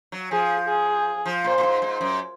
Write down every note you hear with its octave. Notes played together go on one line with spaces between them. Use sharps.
F#3
F3 G#4
G#4
F3
A#2 C5
A#2
G#2
G#2
F#2